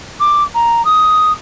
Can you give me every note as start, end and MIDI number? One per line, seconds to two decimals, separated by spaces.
0.20 0.44 86
0.55 0.84 82
0.85 1.32 87